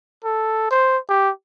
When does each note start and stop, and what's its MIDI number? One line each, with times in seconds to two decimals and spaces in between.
0.24 0.66 69
0.71 0.98 72
1.09 1.30 67